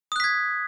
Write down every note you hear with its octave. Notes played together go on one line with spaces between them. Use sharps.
D#6 F#6 G#6 B6